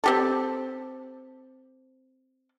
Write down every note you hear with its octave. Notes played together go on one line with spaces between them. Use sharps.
C4 G4 A4